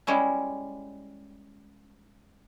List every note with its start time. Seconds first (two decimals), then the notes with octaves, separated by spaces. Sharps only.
0.07 G3 G#3 C#4 E4